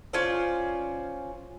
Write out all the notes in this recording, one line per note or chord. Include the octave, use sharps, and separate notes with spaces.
C#4 F4 C5 D5